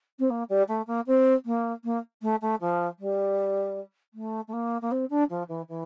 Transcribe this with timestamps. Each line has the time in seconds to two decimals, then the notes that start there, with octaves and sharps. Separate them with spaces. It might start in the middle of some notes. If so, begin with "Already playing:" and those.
0.19 C4
0.30 A#3
0.49 G3
0.68 A3
0.87 A#3
1.07 C4
1.45 A#3
1.84 A#3
2.22 A3
2.41 A3
2.60 F3
2.99 G3
4.14 A3
4.48 A3
4.53 A#3
4.81 A#3
4.91 C4
5.10 D4
5.29 F3
5.48 E3
5.68 E3